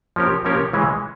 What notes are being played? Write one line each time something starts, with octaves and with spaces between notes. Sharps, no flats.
F3 A#3 C#4 G4 A#4
F3 A#3 C#4 G4 A#4
C#3 E3 G#3 C#4